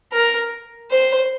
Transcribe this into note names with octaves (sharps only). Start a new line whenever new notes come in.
A#4
C5